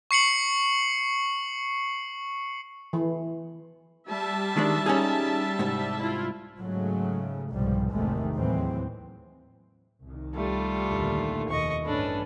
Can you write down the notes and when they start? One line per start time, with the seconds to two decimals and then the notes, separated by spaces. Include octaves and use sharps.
0.11 C#6 C7 C#7 F#7
2.93 E3
4.07 G3 E5 A5
4.57 D#3 G#3 D4
4.86 C#4 D#4 G#4
5.59 C2 G#2
6.00 E4 F4
6.60 G#2 C#3 F#3 G#3 A3
7.51 C2 F2 G#2 B2 F3 G3
7.91 G#1 E2 C3 D#3 G#3 A3
8.36 D#2 A2 E3 F#3 G#3 C4
10.05 C2 D#3
10.35 G3 A3 F4
10.87 D#2 A#2 D3
11.49 F1 D#2 B2 D#5 C#6
11.86 A1 G2 C#4 D4 A4 B4